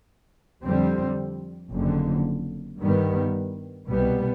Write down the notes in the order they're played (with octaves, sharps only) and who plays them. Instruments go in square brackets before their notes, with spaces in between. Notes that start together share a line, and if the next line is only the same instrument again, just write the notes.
[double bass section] F2 D3 G3 C4
F#1 F2 D3
G2 D#3 G3 B3
C2 B2 G3 B3